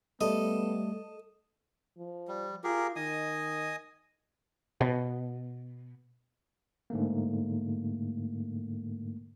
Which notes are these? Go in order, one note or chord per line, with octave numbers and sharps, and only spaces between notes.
G3 A3 B3 A4 D#5
F3
G3
F4 G4 G#4 A#4
D#3 D#5 G#5 D#6
B2
G#2 D3 A3 A#3